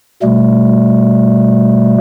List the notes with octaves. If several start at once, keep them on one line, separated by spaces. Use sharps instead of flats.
B2 G3 A3